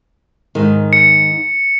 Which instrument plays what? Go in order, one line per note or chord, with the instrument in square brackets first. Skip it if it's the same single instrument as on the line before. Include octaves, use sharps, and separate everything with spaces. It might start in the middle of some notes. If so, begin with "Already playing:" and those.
[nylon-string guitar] G#2 D#3
[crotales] C#7